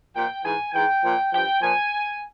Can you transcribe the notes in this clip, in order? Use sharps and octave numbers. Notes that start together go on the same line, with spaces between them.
A#2 F3 G5
G#2 E3 G#5
G#2 E3 G5
A#2 F3
G2 F3 G5
A#2 F3 G#5